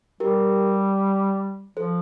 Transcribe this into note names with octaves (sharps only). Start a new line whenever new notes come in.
G3 G4 A#4
F3 A4 C5